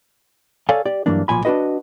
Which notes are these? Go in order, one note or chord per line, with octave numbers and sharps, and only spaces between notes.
A4 C#5 D5 F5 G#5
G4 D5
G2 E3 F#3 A#3 D4
B1 A#2 F3 G#5 B5
D4 F4 F#4 B4 D#5